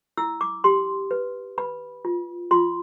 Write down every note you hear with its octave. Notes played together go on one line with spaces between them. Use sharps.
E4 E6
D6
G4 C6
B4
B4 B5
F4
F4 C6